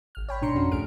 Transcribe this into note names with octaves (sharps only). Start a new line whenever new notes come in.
G#1 F6
C#5 G5 B5
G#2 B2 D4 A#5 C6 C#7
F2 G#2 C#4 F#4
C2 A3 G#4 F6 D7